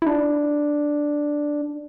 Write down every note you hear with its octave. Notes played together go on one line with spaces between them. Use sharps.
E4
D4